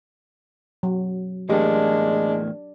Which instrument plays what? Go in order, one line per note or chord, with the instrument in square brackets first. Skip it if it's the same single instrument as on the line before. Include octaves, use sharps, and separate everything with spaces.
[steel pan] F#3
[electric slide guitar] E2 A2 A#3 [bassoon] G#3 [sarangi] D4 [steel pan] G4